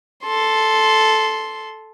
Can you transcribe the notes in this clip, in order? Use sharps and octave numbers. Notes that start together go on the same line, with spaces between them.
A4 C6